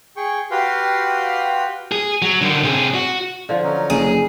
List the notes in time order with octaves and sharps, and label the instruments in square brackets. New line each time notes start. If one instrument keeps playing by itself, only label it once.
[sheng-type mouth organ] G#4 G5 C#6
F#4 G4 B4 F5 G5 C6
[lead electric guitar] G#4
F#3
D3 D#3
C3 G#4
F#4
[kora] D3 F3 [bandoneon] F4
[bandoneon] F#3 C#4 D#4
[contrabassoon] F#1 [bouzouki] G#4